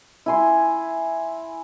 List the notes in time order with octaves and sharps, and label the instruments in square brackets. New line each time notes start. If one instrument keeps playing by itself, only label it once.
[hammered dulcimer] E4 G#5 C6